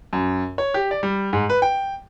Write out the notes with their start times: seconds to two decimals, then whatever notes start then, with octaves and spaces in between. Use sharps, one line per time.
0.13 F#2
0.58 C#5
0.74 G4
0.91 D5
1.03 G3
1.33 G#2
1.50 B4
1.62 G5